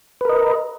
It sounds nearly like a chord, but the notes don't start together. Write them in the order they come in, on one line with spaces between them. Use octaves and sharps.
B4 A#4 D#5